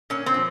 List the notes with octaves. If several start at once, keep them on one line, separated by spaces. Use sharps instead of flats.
A#2 C#4
C4
F3